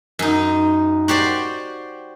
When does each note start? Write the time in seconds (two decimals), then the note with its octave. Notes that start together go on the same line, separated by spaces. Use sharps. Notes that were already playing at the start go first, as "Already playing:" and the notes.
0.19 F#2 D#4
1.08 F#4 G4 C5 D5